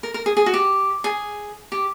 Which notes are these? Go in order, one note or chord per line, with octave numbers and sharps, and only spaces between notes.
A#4
A#4
G#4
G#4
F#4
G4
G#4
G4